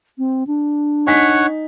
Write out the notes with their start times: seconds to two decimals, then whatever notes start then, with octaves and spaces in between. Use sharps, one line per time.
0.18 C4
0.47 D4
1.07 D#4 C#5 F#5 G#5 C#6 B6